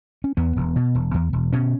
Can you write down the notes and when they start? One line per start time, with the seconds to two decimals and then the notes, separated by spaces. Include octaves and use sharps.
0.24 C#4
0.37 E2 B3
0.56 E1
0.76 B2
0.95 E1
1.14 E2
1.33 E1
1.53 B2 C#4